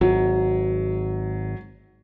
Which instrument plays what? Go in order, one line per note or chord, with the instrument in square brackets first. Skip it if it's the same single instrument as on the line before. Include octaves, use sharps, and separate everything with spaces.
[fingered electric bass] G#1 [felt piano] F#3